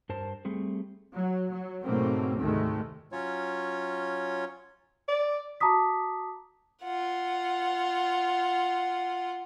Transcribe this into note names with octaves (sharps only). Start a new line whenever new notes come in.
G2 A#4 C5 A5
G3 A3 C4 G#4
F#3
F#3
G#2 B2 F#3 A3 A#3 C4
D2 G#2 C3 D#3 G#3 A3
F#3 C#4 F4 C#5
D5
F#4 A5 A#5 D6 D#6 B6
F4 F#5